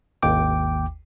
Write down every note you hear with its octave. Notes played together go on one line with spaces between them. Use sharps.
G#1 D#2 G5 D6